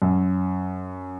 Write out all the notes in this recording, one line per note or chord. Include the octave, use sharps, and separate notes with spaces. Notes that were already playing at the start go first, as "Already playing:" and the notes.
F#2